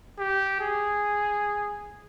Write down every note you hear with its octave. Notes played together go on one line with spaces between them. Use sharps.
G4
G#4